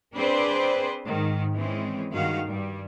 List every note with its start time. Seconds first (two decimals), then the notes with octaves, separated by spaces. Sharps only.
0.15 C4 D4 G#4 B4 C5 D5
1.06 G#2 D#3
1.54 E3 G#3 C4 C#4
2.11 G2 D#3 G#3 F#4 F5
2.45 G2 G3